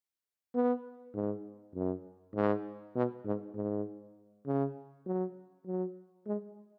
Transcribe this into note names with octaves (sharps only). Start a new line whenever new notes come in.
B3
G#2
F#2
G#2
B2
G#2
G#2
C#3
F#3
F#3
G#3